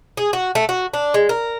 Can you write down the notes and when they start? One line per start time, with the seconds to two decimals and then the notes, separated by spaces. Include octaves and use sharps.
0.17 G#4
0.33 F#4
0.55 A3
0.69 F#4
0.94 D4
1.14 G#3
1.29 A#4